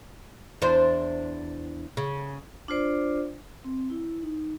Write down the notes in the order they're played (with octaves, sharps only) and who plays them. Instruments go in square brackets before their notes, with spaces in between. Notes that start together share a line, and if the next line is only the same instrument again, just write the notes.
[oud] E2 D4 C5
C#3
[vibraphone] D4 F4 C5 D5
C4
E4
D#4